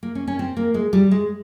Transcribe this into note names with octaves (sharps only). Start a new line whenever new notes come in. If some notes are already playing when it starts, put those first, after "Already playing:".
A#3
C#4
C#4
C4
A#3
G#3
G3
G#3